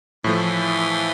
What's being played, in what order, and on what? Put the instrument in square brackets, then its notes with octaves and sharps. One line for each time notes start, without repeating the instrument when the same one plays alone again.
[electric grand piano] A2 F3 A3 [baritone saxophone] E3